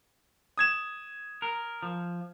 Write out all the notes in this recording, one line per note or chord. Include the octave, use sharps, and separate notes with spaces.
D#6 G#6 E7
A#4
F3